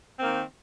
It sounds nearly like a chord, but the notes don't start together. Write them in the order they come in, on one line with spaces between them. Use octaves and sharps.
C4 A#3 D#3